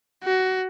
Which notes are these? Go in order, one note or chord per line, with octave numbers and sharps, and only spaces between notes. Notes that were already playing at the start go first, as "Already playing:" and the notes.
F#4